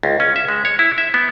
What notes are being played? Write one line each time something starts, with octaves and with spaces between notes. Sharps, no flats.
C#2
C#4
E5
G#3
C#5
E4
E5
B3